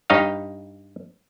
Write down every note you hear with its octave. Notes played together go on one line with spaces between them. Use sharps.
G2 D#4 C#5 D#5 F5